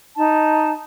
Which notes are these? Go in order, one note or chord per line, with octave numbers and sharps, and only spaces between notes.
D#4 A5